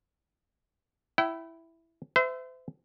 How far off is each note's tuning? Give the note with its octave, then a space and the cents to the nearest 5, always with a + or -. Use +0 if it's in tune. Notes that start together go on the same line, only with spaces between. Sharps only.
E4 +0 G5 -35
C5 -40 E5 +0